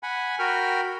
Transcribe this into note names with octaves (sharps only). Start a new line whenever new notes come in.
F#5 G#5 B5
F#4 A#4 G5 B5 F6